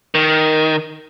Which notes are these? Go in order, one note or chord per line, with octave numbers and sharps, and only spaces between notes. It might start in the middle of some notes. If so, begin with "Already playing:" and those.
D#3